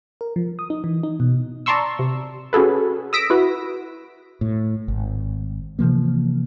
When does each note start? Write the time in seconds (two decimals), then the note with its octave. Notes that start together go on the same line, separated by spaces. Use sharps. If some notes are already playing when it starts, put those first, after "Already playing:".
0.21 A#4
0.36 F3
0.59 D#6
0.70 D#4
0.84 E3
1.03 D#4
1.20 B2
1.66 D5 A5 A#5 C6 C#6 E6
1.99 C3
2.53 C#4 F#4 G#4 A4 B4
3.13 D#6 E6 A#6 B6 D7
3.30 E4 F#4 B4
4.41 A2
4.88 G#1
5.79 C3 E3 F3 A#3